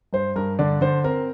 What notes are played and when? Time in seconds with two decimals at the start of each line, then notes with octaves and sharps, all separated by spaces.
0.13 G2 C5
0.36 G2 A#4
0.59 D3 D5
0.81 D3 C5
1.04 C4 A#4